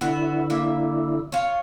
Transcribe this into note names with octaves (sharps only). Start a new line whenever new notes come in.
D3 B3 E4 F#4
A#3 E5
F4 C#5